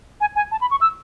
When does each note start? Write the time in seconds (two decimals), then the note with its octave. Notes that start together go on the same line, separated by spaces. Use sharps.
0.21 G#5
0.36 G#5
0.51 A5
0.61 B5
0.71 C#6
0.81 E6